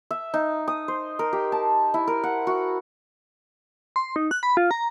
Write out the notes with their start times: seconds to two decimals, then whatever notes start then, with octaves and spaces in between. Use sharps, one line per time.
0.11 E5
0.34 D#4
0.68 D#6
0.88 C5
1.19 A#4
1.33 G4
1.52 A5
1.94 E4
2.07 A#4
2.23 F#5
2.47 F#4
3.96 C6
4.16 D#4
4.31 F#6
4.43 B5
4.57 F4
4.71 A#5